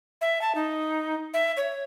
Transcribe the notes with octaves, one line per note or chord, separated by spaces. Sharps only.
E5
A5
D#4
E5
C#5